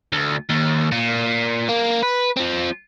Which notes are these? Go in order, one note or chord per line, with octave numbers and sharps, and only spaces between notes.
D2
D#2
A#2
A#3
B4
F3 C4